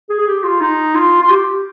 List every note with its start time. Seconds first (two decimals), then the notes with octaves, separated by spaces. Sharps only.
0.10 G#4
0.20 G#4
0.27 G4
0.44 F4
0.61 D#4
0.95 F4
1.22 F4
1.30 G4